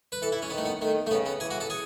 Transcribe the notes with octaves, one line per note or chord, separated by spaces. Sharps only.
B4
E3 A4
E4
C#4
D#3 B3
A3
B3
D#3 A3
A3
C#3 B3
B3
E3 G#4
F#4
A4
G#4